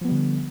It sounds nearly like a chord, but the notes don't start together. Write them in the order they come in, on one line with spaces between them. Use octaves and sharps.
F3 B3 G3 D3